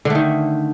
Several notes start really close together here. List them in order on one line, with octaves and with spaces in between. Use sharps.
D3 A3 D#3